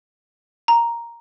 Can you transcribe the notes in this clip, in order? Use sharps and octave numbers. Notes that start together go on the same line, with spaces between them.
A#5